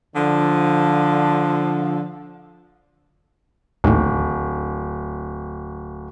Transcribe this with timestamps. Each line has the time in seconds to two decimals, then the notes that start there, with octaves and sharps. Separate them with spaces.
0.15 D3 F3
3.84 D1 A1 D#2